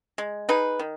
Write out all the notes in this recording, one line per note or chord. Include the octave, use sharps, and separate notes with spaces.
G#3
D#4 G#4 B4
D#3